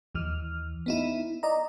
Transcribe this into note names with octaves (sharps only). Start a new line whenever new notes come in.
D#2 E3 F6
B3 D#4 E4
D5 D#5 A#5